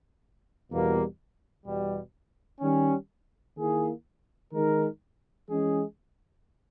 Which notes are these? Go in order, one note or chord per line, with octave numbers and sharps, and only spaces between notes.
E2 B2 G3 A#3
E2 B2 G3
D#3 G3 C#4
D#3 A#3 E4 G#4
D#3 G#3 D#4 A#4
E3 G#3 C#4 G#4